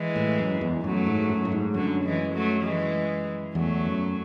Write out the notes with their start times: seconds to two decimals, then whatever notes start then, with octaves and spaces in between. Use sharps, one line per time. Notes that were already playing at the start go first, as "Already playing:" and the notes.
Already playing: E3 G#3
0.16 A2
0.39 F#2
0.61 E2
0.84 F#2 F#3 A3
1.07 G#2
1.29 F#2
1.45 A2
1.52 G#2
1.74 F#2 D3 F#3
2.04 E3 G#3
2.34 F#3 A3
2.64 E3 G#3
3.55 E2 F#3 A3
3.86 F#2